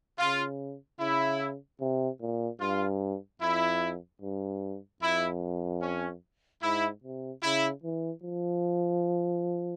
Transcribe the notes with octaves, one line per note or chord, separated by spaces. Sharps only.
C#3 F4
C#3 E4
C3
A#2
G2 F4
F2 E4
G2
F2 E4
C#4
G#2 E4
C3
C#3 E4
E3
F3